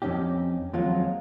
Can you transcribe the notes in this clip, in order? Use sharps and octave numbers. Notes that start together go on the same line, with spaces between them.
F2 G#2 C#4 D#4 G4
D#2 F3 F#3 G#3 C4 F4